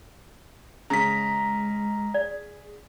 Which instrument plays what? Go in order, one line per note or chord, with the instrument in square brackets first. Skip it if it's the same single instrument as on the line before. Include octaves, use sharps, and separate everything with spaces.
[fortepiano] C#3 [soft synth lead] G#3 [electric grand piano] A#5 B6
[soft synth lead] G#4 [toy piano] D5